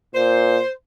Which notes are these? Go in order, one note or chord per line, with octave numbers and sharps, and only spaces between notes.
A#2 C5